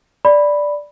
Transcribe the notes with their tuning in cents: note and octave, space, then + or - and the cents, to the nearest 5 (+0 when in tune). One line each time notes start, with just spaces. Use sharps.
D5 +0 B5 +0